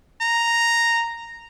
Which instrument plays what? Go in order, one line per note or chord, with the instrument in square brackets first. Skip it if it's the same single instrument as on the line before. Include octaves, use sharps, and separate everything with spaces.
[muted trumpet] A#5